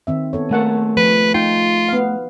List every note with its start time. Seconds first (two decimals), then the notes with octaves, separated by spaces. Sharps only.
0.07 D#3 C4 E5
0.33 B3 A4 C#5
0.51 A3 A#3 G#4 F#5 A5
0.97 F3 B4
1.34 D#4 F4 G5
1.89 B3 F5